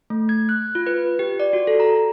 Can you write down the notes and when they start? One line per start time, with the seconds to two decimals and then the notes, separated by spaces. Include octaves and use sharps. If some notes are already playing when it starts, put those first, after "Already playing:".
0.10 A3
0.29 G#6
0.49 F#6
0.75 F4
0.87 B4
1.19 G4
1.40 D5
1.53 F#4
1.67 A4
1.80 A#5